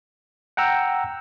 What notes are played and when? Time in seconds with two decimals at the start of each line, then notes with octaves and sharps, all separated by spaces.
0.57 F#5 G5 A#5 E6